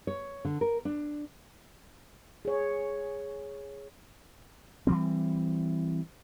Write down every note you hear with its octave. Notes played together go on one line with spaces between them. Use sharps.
C#5
D3
A#4
D4
G#4 C#5
E3 F#3 G3 C4